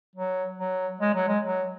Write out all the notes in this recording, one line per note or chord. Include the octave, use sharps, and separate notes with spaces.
F#3
F#3
G#3
F#3
G#3
F#3